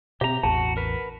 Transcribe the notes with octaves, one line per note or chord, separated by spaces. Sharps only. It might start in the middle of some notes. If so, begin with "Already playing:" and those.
B2 C4 G4 E5 A#5
A1 E2 F#4 A5
A#4 B4